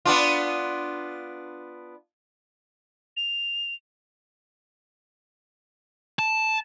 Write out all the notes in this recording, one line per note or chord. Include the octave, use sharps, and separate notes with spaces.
B3 D4 F4
F7
A5